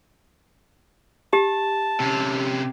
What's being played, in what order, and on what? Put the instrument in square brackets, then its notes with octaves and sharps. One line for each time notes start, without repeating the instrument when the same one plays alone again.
[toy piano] G4 [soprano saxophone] A5
[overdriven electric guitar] C3 C#4